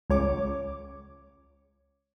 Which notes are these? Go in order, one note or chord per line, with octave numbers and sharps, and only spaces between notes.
C#2 C#5 D6